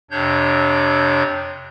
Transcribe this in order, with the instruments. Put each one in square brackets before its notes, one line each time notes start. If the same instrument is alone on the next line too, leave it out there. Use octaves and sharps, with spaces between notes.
[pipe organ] F2 C3 D4 C#5 G6